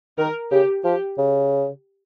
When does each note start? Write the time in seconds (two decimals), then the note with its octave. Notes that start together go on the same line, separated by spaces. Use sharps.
0.18 D#3 A#4
0.51 C#3 G4
0.84 F3 G4
1.18 C#3